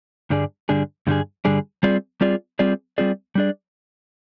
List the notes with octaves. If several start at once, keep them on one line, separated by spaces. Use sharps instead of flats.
G2 D3 G3 D4 G#4
G2 D3 G3 D4 G#4
G2 D3 G3 D4 G#4
G2 D3 G3 D4 G#4
G3 C4 F4 G#4 D5
G3 C4 F4 G#4 D5
G3 C4 F4 G#4 D5
G3 C4 F4 G#4 D5
G3 D4 G#4 D5